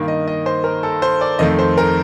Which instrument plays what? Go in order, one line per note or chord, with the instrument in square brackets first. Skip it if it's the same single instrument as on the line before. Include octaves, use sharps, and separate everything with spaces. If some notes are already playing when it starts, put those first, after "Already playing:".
Already playing: [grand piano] G2 D#3 A#3
D#5
D#5
C5
A#4
A4
C5
D5
F2 D#3 A3 D#5
C5
A#4